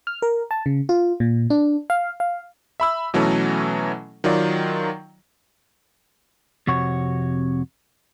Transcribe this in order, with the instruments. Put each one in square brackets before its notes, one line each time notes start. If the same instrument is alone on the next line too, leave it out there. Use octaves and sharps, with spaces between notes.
[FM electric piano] F6
A#4
A5
C#3
F4
A#2
D4
F5
F5
[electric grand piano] E5 B5 E6
B2 E3 F#3 A3 C#4 A4
D#3 F#3 F4 D5
[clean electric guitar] F2 C3 F#4 C#5